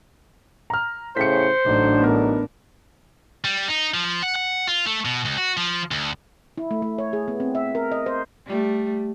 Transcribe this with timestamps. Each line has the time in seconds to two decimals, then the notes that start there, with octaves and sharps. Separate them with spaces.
0.70 A#5 F6
1.17 A2 C#3 C5 B6 C#7
1.66 A1 D3 F#3 D4 D#4
2.01 B3 A#4
3.45 G3
3.68 D#4
3.94 F3
4.23 F#5
4.35 F#5
4.67 F4
4.86 A3
5.05 B2
5.25 C#2
5.38 F#4
5.57 F3
5.91 D2
6.58 E4
6.71 A3
6.82 A3
6.98 C#5
7.13 G#4
7.28 B3
7.40 C4
7.55 E5
7.75 A#4
7.92 D#5
8.06 C5
8.46 G3 A3